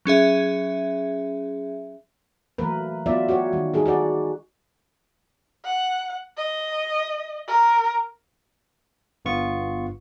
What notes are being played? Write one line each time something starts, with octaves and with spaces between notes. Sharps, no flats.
F#3 C#4 G#4 E5
E3 F#3 A3 A#3 A#4 B4
F#3 B3 F4 D5 E5
F#4 G4 C#5
D#3 G3
G3 D#4 G#4 A4
F#4 G#4 D5
F#5
D#5
A#4
G1 G2 B3 F4 C#6